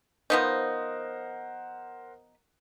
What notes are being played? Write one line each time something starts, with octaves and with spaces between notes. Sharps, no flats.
F3 B3 D#4 A#4 C5 F#5